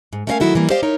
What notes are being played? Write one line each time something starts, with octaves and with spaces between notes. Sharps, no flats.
G#2
A3 C#4 A#4 D#5 F5 G#5
D#3 F3 F#3 E4 F#4 A4
F#2 E3 G3 A#3
G4 C5 D5 D#5 F5
D#4 E4 A#4 C#5